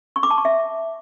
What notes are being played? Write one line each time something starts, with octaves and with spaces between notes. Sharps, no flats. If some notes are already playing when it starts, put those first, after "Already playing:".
C#6
D6
A5
C#6
E5